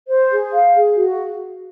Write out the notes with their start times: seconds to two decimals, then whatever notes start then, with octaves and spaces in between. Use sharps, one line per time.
0.08 C5
0.30 G#4
0.52 F5
0.75 G#4
0.96 F#4